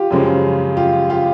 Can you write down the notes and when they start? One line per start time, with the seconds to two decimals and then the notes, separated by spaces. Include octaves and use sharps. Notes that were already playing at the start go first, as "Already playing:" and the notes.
Already playing: F4 G4
0.11 F#2 C#3 F3 G#3
0.77 F4 G4
1.09 F4 G4